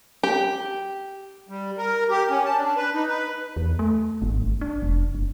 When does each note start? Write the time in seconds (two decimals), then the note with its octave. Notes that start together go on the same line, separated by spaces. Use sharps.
0.23 G4
1.49 G3
1.78 A#4
2.10 G4
2.30 C#4
2.45 A5
2.57 D4
2.77 B4
2.94 D#4
3.08 B4
3.56 E2
3.79 A3
4.22 G#1
4.42 G1
4.61 D4
4.82 F1
5.14 F#1